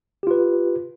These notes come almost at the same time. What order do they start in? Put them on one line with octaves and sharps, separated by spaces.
G4 F4 B4